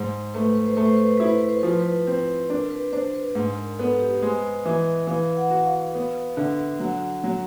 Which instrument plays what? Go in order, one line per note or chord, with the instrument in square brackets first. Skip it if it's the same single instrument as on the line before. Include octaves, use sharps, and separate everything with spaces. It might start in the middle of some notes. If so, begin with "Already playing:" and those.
Already playing: [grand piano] G#2 [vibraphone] C5
[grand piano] A3 [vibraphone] B4
[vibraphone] C5
B4
C5
[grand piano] A3 [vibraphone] B4
[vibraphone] C5
B4
C5
[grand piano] E4 [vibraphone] B4
[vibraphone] C5
B4
C5
[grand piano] F3 [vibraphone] B4
[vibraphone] C5
B4
[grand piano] C4
[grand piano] D4 [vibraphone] A#4
[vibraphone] B4
[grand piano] D4 [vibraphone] C5
[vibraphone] B4
[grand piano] G#2
[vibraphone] A#4
[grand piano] B3 [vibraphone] A4
[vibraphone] G4
[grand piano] G#3 [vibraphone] C5
[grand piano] E3 [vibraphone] E5
[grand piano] E3 [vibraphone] F5
[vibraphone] F#5
[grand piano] F#4
[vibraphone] F5
[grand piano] B3 [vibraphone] F5
[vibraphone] F5
[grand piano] D3 [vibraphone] E5
[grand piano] F#3 [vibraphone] F#5
[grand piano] F#3